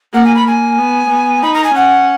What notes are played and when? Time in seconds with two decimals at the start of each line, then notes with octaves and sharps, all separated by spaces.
0.14 A#3 F#5
0.24 G#5
0.35 B5
0.46 A#3 G#5
0.78 B3
1.10 B3
1.42 D#4 B5
1.53 A#5
1.64 G#5
1.74 C#4 F#5